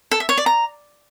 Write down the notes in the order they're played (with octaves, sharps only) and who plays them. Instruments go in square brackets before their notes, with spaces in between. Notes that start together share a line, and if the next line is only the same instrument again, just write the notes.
[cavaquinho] A4
E5
C#5
D5
A#5